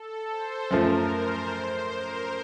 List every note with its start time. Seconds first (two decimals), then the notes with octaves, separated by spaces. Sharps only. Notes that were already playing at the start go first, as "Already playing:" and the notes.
Already playing: A4
0.31 C5
0.71 F#2 F3 A3 A#4
1.11 C5
1.52 C5
1.92 A#4